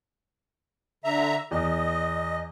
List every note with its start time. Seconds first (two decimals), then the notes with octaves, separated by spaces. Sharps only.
1.04 D3 E5 A#5
1.51 E2 D#5